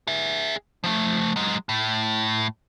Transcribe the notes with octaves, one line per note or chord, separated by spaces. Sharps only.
G#4 E5
F3 A3
F#3 G#3
A2